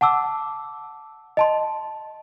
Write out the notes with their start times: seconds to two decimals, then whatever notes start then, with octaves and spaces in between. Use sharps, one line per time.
0.01 F#5 A5 D6 E6
1.37 D#5 A5 C6